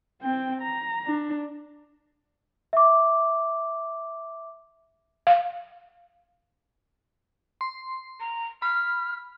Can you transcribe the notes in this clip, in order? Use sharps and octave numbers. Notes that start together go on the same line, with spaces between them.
C4 G5
A#5
D4
E5 D6
F5
C6
A#5
B5 F6